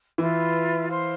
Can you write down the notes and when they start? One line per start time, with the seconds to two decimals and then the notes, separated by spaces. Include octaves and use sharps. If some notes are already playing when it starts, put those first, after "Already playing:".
0.18 E3 F4 B4 E5
0.89 C5 F5 C6